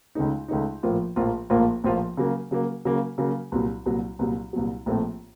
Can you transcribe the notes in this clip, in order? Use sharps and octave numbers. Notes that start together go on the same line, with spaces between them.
C#2 C#3 A3 D#4
C#2 C#3 A3 D#4
A#1 A2 F3 A#3 F4
A#1 A2 F3 A#3 F4
A#1 A2 F3 A#3 F4
A#1 A2 F3 A#3 F4
C#3 F#3 A#3
C#3 F#3 A#3
C#3 F#3 A#3
C#3 F#3 A#3
C2 A#2 F#3
C2 A#2 F#3
C2 A#2 F#3
C2 A#2 F#3
A#1 A2 A3 C4